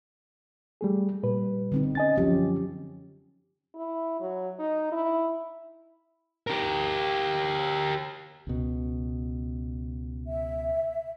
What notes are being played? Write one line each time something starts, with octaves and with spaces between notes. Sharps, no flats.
G3 A3 G#4
A#2 G3 B4
D3 C4 D#4
C#4 D#5 G#5 A6
F#2 F3 F#3 C#4 G4
E4
F#3
D#4
E4
G4 A#4
C#2 B2
E5